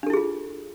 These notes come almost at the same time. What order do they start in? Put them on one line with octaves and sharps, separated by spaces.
D4 A4 E4 G#4 F4